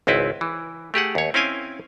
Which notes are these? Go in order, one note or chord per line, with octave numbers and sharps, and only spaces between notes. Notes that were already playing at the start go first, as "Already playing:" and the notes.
G#1 C#2 C4 E4 B4
E3
A3 G4 G#4 F#5
D#2 C#5
C4 C#4 E4 F5 G5 G#5